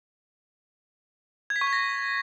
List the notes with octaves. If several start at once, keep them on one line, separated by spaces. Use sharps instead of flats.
G#6
B6
C#6
G#6
A#6